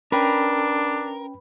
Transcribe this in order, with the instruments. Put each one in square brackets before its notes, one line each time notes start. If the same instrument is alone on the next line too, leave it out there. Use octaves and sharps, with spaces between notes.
[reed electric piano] C#4 G5 [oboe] D4 [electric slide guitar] A#4 [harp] B4